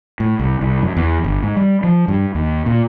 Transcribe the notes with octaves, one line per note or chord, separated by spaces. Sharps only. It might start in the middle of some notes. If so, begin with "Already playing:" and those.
A2
C2
C2
F#2
E2
G1
G#2
G3
F3
G2
D#2
A#2